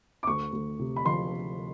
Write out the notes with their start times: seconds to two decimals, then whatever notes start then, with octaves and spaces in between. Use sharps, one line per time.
0.23 D6
0.27 D2 C#6
0.53 D2
0.79 C3
0.96 B5
1.06 F3 C6